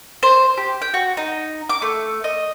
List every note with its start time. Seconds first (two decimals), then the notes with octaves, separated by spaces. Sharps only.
0.23 C5
0.58 G4
0.82 G5
0.94 F#4
1.17 D#4
1.69 D6
1.82 A3
2.24 D#5